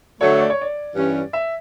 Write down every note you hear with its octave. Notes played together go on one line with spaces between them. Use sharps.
D3 F#3 A3 C#5
D5
C#5
D5
G2 E3 G3 C#4
E5